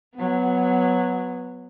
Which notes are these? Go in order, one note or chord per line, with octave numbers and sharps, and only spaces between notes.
F#3 B3